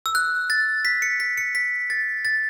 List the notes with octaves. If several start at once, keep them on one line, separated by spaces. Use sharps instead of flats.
E6
F#6
A6
B6
C#7
B6
C#7
B6
A6
A6